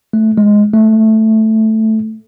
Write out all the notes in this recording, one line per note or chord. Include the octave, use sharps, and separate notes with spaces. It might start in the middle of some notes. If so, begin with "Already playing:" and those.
A3
G#3
A3